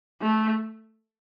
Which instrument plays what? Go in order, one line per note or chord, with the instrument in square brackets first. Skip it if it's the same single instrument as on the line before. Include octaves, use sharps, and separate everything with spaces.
[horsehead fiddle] A3